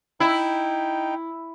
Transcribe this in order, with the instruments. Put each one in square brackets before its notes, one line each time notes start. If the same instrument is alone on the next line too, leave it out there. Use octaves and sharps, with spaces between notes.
[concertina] D#4 G5 [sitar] E4